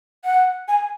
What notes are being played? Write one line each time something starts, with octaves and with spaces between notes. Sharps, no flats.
F#5
G#5